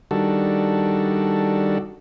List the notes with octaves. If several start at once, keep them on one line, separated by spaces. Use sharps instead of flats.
D#3 G3 D4 F#4 A4